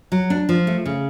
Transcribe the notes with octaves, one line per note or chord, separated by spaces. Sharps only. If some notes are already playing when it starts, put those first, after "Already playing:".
F#3
D4
F3
A3
C#3